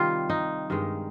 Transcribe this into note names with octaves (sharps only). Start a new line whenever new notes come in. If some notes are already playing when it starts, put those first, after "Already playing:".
Already playing: C3 D#3 G3 F4
D#4
G2 D#3 G#3